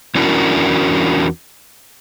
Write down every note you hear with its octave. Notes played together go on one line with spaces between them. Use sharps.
E2 C#4 D4 E4 F#4 A#4